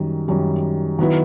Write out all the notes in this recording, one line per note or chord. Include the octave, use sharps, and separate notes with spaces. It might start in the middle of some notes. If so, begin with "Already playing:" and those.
Already playing: F#2 D#3 G3
F#2 D#3 G3
D#3 F#3 B3 E4